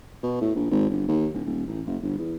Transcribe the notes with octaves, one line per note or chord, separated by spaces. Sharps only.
B2
A2
A#1
G#1
G1
D#2
D1
D#1
A1
F#1
G1
E2